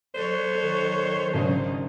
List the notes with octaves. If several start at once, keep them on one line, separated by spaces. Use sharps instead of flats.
F#3 A4 C5 C#5
D#3
G#1 C#3 F#3 D4 D#4